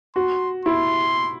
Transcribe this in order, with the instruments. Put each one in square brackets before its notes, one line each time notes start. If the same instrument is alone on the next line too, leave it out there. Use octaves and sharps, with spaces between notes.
[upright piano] F#4 [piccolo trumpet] C6
[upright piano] E4 [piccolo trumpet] C6